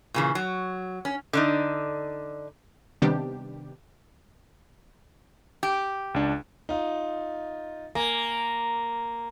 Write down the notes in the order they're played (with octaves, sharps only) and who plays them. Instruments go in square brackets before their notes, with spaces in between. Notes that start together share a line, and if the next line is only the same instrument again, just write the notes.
[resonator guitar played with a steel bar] A#2 C#3 E3
F#3
C#4
D3 D4 D#4
[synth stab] C3 D#3 G3 B3 D4 G4
[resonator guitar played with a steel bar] G4
[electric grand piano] C#2 D4
[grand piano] D#4 F4
[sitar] A#3 [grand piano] G#5